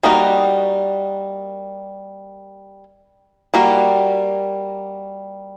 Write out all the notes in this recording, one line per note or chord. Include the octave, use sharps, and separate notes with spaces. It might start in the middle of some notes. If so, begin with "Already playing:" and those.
G3 A#3 D#4 F#4 A#4
G3 A#3 F#4 A#4